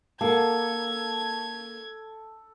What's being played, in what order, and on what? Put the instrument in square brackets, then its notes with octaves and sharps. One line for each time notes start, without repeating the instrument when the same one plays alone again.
[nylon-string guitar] A#3 [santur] A4 [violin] G#6